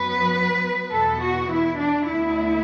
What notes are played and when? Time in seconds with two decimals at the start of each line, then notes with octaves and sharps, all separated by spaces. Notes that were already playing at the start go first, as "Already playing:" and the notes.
Already playing: F#2 F#3 B3 B4
0.92 E2 B2 B3 A4
1.21 F#4
1.50 E4
1.78 D4
2.08 D2 D3 B3 E4